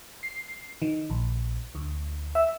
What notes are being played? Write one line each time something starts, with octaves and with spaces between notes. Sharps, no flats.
C7
D#3
A#1
D2
E5